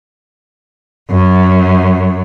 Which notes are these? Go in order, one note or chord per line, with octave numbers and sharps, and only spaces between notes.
F#2